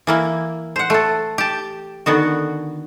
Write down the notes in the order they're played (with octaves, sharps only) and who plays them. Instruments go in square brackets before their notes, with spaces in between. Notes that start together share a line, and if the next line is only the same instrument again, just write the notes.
[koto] E3 A#3 E4
C5 F#5
A3 A4
G4 A5
D3 D#3 B3 F#4